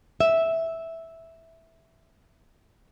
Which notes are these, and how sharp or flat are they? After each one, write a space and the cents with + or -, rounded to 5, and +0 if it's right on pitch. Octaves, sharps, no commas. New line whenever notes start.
E5 -5